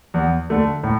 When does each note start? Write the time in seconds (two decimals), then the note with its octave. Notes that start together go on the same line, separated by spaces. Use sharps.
0.14 E2
0.50 D3 A3
0.83 A2